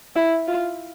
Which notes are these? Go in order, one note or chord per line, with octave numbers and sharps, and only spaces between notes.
E4
F4